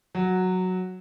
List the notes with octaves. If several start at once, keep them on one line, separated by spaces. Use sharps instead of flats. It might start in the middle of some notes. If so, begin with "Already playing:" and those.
F#3